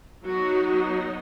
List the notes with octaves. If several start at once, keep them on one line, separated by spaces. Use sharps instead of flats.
F#3 B3 D#4 F#4